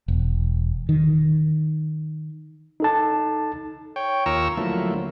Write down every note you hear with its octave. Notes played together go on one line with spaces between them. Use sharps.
E1
D#3
D#4 A4 A5
C#5 G5
D#2 F4 A#4 A#5 C#6 E6
D3 F3 F#3 A3 A#3 E4